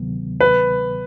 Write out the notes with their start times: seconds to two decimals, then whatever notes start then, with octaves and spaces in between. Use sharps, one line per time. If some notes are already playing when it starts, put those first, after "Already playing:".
Already playing: D2 C3 D#3 F#3 B3
0.40 B4